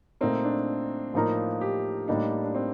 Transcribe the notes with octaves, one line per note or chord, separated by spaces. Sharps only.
A#2 A3 C4 D#4 A#4
D4
A2 F3 A#3 D#4 A#4
G4
A2 G3 A#3 D4 D#4
D4
C4